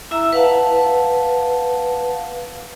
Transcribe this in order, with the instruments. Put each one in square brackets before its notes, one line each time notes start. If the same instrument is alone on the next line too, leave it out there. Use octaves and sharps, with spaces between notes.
[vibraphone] E4 E5 A#5 E6
B4 F5 F#5 A5